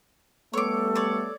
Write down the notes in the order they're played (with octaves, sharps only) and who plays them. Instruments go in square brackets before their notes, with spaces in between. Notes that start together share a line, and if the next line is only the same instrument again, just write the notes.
[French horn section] G3 A3 B3 [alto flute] A4 [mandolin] C#5 D6
[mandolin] C#5 D5